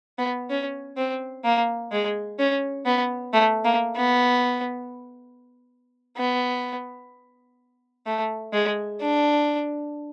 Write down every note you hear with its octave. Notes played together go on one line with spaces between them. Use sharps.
B3
C#4
C4
A#3
G#3
C#4
B3
A3
A#3
B3
B3
A3
G#3
D4